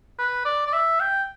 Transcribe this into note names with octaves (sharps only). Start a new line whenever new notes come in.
B4
D5
D5
E5
G5